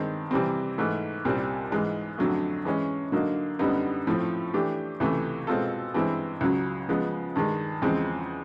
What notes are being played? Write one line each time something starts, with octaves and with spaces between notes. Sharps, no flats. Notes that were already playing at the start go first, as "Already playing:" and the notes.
Already playing: G2 D#3 G#3 C4
C3 E3 G3 C4
G#2 E3 A3
C2 A#2 G3 C4
G#2 E3 G#3
F2 D3 F#3 A3
E3 G#3 C#4
D3 F#3 A#3 D#4
F#2 D3 G3 B3 D#4
A2 F3 A3 C4
E3 A3 D4 G4
C#2 C3 E3 A3
B2 G#3 C4 F4 A4
G2 E3 G#3 C4 E4
C#2 C#3 F#3
C#3 F3 G#3 B3
G2 D#3 G#3
E2 C#3 F3 G#3 C4